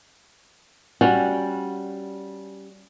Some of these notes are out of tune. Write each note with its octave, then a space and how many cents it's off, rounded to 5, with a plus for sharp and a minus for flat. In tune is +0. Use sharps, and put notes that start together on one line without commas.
G3 -10 C#4 +0 F#4 -10